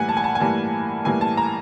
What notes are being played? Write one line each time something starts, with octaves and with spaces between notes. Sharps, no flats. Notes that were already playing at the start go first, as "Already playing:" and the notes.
Already playing: A2 E3 G3 A#3 F#5 G#5
A5
G#5
A5
G#5
A2 E3 G3 A#3 A5
A2 E3 G3 A#3 G#5
A5
A#5